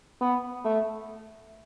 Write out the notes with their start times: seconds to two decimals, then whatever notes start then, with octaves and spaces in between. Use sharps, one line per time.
0.21 B3
0.65 A3